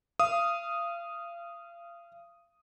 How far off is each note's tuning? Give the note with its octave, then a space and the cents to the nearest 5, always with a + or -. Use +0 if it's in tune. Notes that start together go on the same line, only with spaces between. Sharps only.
F5 -30 D#6 +0